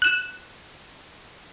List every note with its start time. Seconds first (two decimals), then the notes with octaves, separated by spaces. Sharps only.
0.02 F#6 E7